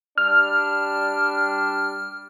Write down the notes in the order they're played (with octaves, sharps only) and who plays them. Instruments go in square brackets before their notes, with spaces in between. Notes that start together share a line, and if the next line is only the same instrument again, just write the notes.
[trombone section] G3 D4 [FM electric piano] F6